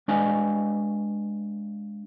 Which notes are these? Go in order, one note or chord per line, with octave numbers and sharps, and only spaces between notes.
G#3 D4 B4 D#5 F5 G#5